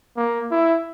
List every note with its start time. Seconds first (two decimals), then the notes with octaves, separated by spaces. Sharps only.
0.17 A#3
0.51 E4